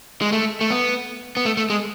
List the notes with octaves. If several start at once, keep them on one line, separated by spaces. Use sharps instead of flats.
G#3
A3
A3
B3
B3
A3
A3
G#3